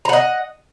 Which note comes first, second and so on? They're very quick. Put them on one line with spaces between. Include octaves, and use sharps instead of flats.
A#5 F#5 D#5